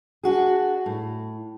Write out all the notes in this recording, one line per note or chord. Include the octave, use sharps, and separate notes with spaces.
D4 F#4 G#4
A2